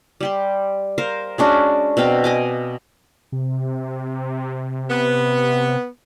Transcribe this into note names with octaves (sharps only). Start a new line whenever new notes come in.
G3 G4 C6
A#4 C5 F5
G#3 C#4 D4 F#4
B2 C4 F5 G5
D#5 G#5 D6
C3
B3